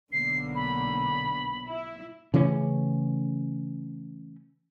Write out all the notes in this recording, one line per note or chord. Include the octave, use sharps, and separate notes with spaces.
B1 D3 A#3 B3 C7
B5
E4
C#3 E3 A3 C#4